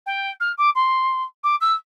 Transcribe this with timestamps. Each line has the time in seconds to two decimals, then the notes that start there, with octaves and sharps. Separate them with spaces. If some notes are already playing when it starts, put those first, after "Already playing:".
0.06 G5
0.40 F6
0.58 D6
0.75 C6
1.43 D6
1.61 E6